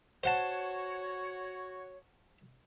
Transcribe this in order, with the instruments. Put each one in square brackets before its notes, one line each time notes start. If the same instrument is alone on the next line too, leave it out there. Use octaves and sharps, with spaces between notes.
[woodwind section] F#4 C#5 [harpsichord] C5 F#5 A5